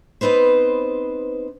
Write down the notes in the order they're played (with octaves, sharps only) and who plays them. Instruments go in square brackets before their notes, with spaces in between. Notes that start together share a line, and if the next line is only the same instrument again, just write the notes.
[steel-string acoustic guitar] B3 C4 D#4 B4 C5